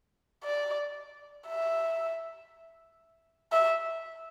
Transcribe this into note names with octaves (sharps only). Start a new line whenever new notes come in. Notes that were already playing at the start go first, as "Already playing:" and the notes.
D5
E5
E5